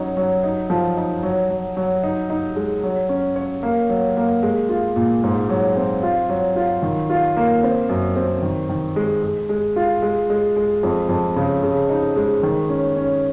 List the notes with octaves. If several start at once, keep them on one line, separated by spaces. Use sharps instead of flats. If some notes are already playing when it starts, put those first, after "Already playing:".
Already playing: F#3 C#4 D#4
F#3
D#4
F3
D#4
F#3
F#3
F#3
D#4
D#4
G#3
F#3
C#4
C#5
A#3
F#3
A#3
G#3
F4
A#2
G#2
F#3
C4
F4
F#3
F4
D#3
F4
A#3
C4
F#2
C4
D#3
D#3
G#3
G#3
G#3
F4
G#3
G#3
G#3
F2
F2
C#3
C#3
D#4
G#3
D#3
C#4
C#4